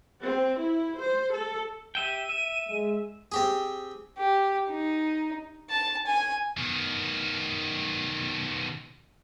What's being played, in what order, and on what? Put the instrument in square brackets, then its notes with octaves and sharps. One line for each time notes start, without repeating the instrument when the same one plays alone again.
[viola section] C4
E4
C5
A4
[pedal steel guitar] G4 E5 G5 [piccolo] D#7
[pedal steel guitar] E5
[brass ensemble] G#3
[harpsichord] C4 G4 G#4
[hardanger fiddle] G4
D#4
A5
G#5
[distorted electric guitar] B2 D#3